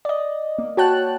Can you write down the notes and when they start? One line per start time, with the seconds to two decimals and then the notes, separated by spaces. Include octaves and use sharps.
0.05 D5 D#5
0.58 A#3
0.77 F#4 C#5 G5 A5 F#6